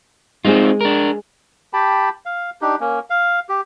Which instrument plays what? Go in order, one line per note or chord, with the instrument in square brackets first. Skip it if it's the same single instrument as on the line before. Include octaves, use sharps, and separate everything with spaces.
[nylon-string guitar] G#3 G#4 [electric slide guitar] C4 D#4 F4
[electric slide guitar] D4 A#4
[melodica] G4 G5 A5 B5
F5
D4 D#4 G4
A#3 C#4
F5
G4